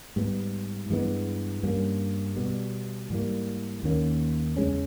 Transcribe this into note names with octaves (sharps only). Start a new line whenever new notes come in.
G#2 G3 B3
G2 E3 G#3 B3
G2 G3 A#3 C#4
B2 G3 B3
G#2 E3 G3 A#3
D#2 D#3 A#3 C#4
E2 C#3 G#3 C#4